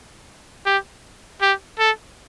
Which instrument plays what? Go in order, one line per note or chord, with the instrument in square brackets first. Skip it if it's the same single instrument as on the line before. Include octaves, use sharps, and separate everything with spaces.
[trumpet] G4
G4
A4